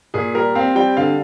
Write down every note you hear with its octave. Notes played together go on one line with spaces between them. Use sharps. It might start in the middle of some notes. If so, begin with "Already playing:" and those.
A#2 G#4
G3 A#4
C4 F5
G3 G5
D3 F5